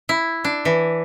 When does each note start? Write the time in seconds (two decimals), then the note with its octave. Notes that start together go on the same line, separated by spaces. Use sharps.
0.09 E4
0.44 D4
0.65 E3